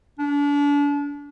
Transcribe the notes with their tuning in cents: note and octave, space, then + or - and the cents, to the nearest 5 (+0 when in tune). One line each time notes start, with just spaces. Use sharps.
D4 -35